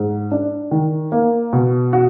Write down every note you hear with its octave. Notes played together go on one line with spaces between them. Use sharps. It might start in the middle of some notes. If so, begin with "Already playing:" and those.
Already playing: G#2
D4
D#3
A#3
B2
F#4